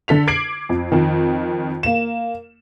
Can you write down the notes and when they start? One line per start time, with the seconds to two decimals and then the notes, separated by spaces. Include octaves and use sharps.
0.08 D3 A4 B6 F7
0.27 D6 G#6 C7 D7 F#7
0.69 F2
0.92 F2 D#3
1.83 A#3 E7